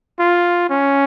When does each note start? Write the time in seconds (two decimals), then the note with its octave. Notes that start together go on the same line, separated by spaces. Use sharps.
0.20 F4
0.70 C#4